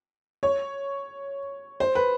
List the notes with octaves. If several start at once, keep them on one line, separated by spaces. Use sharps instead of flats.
C#5
C5
B4